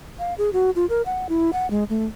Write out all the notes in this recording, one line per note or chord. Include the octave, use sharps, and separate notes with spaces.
F5
G#4
F#4
F4
A#4
F#5
E4
F#5
G#3
A3